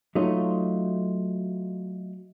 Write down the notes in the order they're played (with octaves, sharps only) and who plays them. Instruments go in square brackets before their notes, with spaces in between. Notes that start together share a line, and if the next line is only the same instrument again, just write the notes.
[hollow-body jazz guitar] F#3 A3 D#4 F4